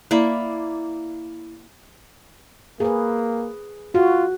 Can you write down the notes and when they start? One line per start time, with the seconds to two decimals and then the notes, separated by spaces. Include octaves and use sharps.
0.11 A#3 E4 D5
2.80 A#3 G#4 B4
3.95 F4 F#4